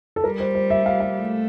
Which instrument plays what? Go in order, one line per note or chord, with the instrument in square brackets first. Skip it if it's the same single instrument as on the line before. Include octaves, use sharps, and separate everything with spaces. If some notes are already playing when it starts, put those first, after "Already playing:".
[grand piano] A4
[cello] G3 [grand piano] A#4
[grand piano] C5
C5
E5
F5
F5
[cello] A3